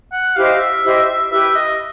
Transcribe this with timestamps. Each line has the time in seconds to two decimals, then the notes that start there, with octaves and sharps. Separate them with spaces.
0.12 F#5
0.36 E4 G4 C5 D#5 F5
0.59 E5
0.84 E4 G4 C5 D#5
1.31 E4 G4 B4 E5
1.55 D#5